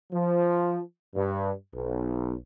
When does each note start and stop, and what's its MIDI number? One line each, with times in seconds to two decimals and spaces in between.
0.12 0.80 53
1.15 1.51 43
1.74 2.35 35